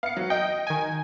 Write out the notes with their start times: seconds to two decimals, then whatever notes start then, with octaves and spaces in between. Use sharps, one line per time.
0.03 B3 F5 C#7
0.17 F#3
0.30 D#5 G5
0.67 D#3 G#5